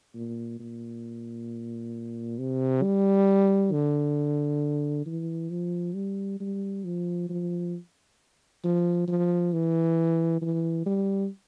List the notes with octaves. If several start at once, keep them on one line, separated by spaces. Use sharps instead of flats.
A#2
A#2
C3
G3
D3
E3
F3
G3
G3
F3
F3
F3
F3
E3
E3
G3